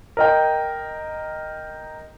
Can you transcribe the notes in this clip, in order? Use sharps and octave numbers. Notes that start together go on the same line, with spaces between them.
A#4 D#5 G5